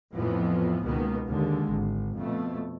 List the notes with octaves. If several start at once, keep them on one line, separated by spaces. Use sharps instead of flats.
F2 A2 E3 F3 B3
C#2 B2 D#3 A#3 B3
D#2 D3 G#3
G#1
F2 B2 A3